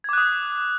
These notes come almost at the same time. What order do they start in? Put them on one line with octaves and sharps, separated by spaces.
G#6 D6 F#6 D#6